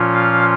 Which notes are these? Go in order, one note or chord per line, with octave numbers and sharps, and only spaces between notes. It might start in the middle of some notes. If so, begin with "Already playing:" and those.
Already playing: A#2 F3 C#4 F4
F5